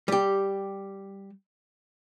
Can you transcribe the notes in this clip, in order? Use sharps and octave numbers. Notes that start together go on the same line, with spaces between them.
G3 G4